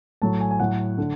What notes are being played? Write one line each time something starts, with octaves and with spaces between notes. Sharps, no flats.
A2 F#3 A3 A5
G#5
G#5
A2 F#3 A3 F#5
D3